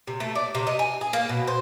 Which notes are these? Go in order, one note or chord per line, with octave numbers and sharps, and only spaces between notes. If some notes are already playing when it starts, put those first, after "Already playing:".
C3
A3
D5
C3
D#5
G#5
G#4
A#3
B2
C5